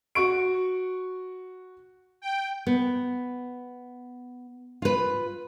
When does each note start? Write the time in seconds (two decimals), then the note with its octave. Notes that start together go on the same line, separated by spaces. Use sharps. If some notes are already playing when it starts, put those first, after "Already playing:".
0.15 F#4 C#6 D7
2.22 G5
2.67 B3
4.82 F4 B4